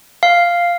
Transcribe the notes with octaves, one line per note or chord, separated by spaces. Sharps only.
F5